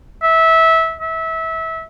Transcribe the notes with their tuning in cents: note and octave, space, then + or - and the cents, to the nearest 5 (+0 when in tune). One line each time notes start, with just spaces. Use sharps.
E5 -20
E5 -25